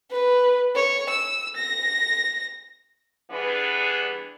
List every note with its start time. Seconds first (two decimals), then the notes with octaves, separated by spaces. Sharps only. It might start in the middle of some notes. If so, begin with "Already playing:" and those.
0.11 B4
0.75 C#5
1.09 E6
1.56 A#6
3.31 E3 G3 B3 D4 G#4 B4